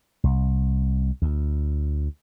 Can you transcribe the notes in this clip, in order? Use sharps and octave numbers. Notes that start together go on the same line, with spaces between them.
C2
D2